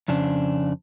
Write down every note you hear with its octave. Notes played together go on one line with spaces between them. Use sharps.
F2 C#3 D4